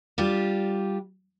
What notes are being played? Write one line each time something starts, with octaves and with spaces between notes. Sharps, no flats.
G3 D4 F4 G4